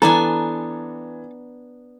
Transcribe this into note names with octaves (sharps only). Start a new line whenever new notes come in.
E3 B3 D4 A4 G#5 A#5